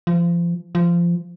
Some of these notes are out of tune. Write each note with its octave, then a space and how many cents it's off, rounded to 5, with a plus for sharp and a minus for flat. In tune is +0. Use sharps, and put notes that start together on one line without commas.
F3 -30
F3 -20